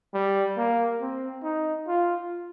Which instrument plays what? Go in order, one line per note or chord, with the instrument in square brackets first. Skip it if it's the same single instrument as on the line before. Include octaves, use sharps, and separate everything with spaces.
[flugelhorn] G3
A#3
C4
D#4
F4